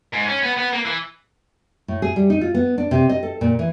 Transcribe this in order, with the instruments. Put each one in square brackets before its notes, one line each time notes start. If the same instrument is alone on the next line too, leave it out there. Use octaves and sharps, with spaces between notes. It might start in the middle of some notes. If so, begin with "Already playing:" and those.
[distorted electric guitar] G#2
C#4
B3
B3
A#3
E3
[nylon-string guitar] A2
G#4
G3
D#4
F4
B3
D4
C3
D#5
A4
A#2
E3